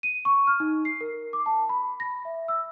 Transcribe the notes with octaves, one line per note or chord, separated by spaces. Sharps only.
D#7
C#6
F6
D#4
C7
A#4
D6
A5
B5
A#6
E5
E6